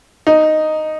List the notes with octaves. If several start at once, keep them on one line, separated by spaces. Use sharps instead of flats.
D#4